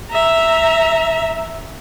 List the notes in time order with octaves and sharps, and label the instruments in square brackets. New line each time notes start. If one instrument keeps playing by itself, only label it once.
[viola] E5 A#5